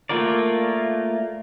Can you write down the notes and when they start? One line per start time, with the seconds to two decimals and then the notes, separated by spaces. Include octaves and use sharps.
0.09 A3 A#3 F4 A#4 D5